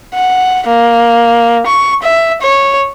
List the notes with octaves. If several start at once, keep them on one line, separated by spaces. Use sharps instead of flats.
F#5
A#3
C#6
E5
C#5